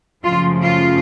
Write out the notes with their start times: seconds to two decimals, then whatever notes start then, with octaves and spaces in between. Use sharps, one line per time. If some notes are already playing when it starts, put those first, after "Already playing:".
0.24 F#2 C#3 F3 A3 F4
0.65 F4